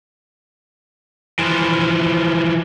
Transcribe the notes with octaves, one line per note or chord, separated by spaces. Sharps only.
E3 F3